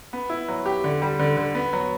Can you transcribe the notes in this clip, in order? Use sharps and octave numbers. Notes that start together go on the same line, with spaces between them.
B3
E4
F#3
G4
D3
G3
D3
D3
B3
F#3